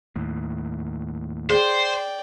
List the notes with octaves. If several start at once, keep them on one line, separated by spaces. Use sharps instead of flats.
D#2 A2
G#4 C5 D5 G5